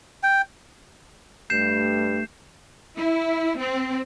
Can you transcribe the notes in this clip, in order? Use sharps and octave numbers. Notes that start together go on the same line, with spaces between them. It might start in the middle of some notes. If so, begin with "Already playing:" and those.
G5
G2 A3 G6 C7 E7
E4
C4